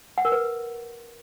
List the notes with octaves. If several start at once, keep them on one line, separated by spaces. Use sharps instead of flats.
F#5
A#4
B4